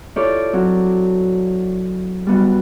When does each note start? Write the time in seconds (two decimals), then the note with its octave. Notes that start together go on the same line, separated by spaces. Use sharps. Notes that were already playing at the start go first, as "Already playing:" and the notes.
0.16 E4 F4 G4 A4 C#5 D5
0.53 F#3 C4 F#4
2.27 G3 B3 F#4